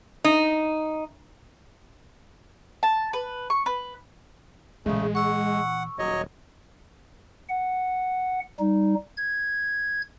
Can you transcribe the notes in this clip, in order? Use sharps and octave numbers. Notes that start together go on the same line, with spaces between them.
D#4
A5
B4
C#6
B4
A#1 C#3 E3 G#3 A3
F#5 C#6 E6
D#1 F#3 C#5 D#5
F#5
G3 D#4
G#6